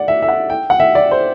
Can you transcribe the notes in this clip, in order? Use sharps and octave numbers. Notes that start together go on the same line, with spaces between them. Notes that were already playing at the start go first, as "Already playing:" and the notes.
Already playing: D5 F#5
E5
E5
F#5
G5
F#5
E5
D5
C5